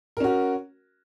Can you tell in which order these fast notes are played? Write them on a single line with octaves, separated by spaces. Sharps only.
A#4 C#4 F#4